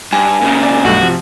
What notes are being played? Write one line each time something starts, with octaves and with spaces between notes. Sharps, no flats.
G2 G#5
A#2 C#3
D5
B1 G2 A3 F#4
C3 F3